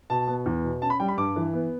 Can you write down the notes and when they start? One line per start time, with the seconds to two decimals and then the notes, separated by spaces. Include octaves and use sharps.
0.10 B2 A5
0.28 B3
0.46 E2
0.64 B2
0.82 C#4 A5
0.90 B5
1.00 G3 G5
1.08 B5
1.17 G2 D6
1.36 E3
1.53 B3